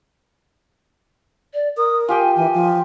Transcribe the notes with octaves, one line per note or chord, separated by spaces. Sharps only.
D5
A#4 D#6
F4 G4 G5 G#5
E3 G#5
F3